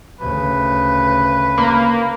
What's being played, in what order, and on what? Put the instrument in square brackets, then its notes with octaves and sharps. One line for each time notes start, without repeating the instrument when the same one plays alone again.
[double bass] D2 C#3 [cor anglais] B4
[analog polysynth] A#3 [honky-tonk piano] B5